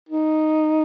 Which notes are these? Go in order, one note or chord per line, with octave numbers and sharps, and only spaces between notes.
D#4